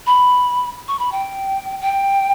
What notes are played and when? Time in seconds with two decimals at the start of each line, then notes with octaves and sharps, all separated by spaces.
0.07 B5
0.88 C#6
0.99 B5
1.12 G5
1.81 G5